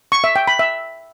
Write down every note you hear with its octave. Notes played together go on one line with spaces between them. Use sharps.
C#6
E5
G5
B5
E5